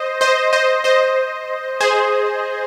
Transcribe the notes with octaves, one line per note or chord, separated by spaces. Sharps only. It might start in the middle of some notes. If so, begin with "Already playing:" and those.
Already playing: C5 D#5
C5 D#5
C5 D#5
C5 D#5
G#4 C5